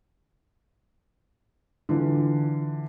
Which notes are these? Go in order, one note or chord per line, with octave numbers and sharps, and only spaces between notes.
D3 E3 F4